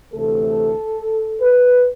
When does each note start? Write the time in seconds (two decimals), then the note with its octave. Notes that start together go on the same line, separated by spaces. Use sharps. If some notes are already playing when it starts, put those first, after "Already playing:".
0.12 D2 C3 E3 A3 A4
1.41 B4